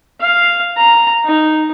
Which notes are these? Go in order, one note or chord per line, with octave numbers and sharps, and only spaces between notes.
F5
A#5
D#4